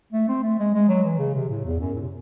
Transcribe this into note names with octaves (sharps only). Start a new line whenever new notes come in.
A3
C4
A3
G#3
G#3
F#3
E3
C#3
C3
A2
E2
F#2
A2
C3